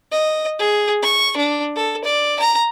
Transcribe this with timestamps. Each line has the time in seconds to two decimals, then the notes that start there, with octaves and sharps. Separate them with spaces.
0.12 D#5
0.59 G#4
1.02 C#6
1.36 D4
1.76 A4
2.04 D5
2.39 A#5